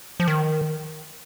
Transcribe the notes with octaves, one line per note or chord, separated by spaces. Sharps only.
F3
D#3